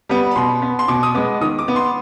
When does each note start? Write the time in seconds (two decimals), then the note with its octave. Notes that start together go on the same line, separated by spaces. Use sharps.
0.09 G3 B3
0.31 B5
0.36 B2 C6
0.62 B3
0.79 C6
0.88 B2 D6
1.03 D#6
1.15 G#3 B3 D6
1.41 D#3 D#6
1.59 D6
1.68 B3
1.76 C6